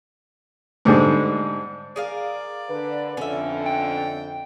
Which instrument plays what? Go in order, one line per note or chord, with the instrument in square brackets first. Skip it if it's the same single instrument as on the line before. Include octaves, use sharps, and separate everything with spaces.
[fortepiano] G#2 D3 G3 G#3
[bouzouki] G#4 A#4 F5 [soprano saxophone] D5
[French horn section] D3 B4
[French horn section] F2 D3 [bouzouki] C#4 E5
[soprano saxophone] G5